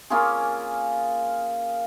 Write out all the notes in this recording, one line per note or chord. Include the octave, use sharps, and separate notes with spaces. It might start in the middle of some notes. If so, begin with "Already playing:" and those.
A#3 C#4 F4 G#4